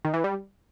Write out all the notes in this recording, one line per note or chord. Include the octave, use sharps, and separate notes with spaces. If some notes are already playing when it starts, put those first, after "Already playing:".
D#3
E3
G3